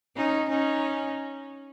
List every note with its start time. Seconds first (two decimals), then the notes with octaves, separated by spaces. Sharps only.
0.16 C#4 D#4
0.50 C#4 D#4